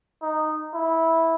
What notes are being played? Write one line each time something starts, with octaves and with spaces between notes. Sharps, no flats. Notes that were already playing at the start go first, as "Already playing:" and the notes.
D#4
E4